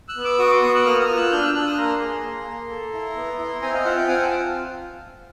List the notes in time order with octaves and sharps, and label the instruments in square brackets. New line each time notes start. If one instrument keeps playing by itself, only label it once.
[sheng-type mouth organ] E6 F#6
B3
D6 E6
F#4 C#6 D#6
C6 D6
B3 C#6 D#6
E6 F#6
A#3 D#6 F6
D#6 F6
F4
E6 F#6
D4 F6 G6
E6 F#6
D4 E6 F#6
D#6 F6
A#3 A#5 C6
G#4
A#3
A#3
A4
E4
B3
E4
C4 G#5 A#5
D#5 F5
F4 E5 F#5
F5 G5
C4 F#5 G#5
G5 A5
F4